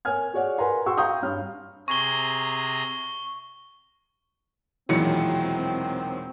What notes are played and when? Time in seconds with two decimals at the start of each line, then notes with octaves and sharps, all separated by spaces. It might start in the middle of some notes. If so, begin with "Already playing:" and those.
0.05 A#4 C#5 G#5 F6 G#6
0.33 F#4 G#4 C#5 D5 F#5
0.58 A#4 B4 F#5 G#5 A#5 C6
0.86 F#4 G#4 G5 C6 C#6 E6
0.97 F5 G5 A#5 C#6 D#6 G6
1.22 G2 C#5 F6
1.88 C3 G#4 A#5 C#6 G7
4.89 E1 A#2 D#3 F#3 C4 E4 C#7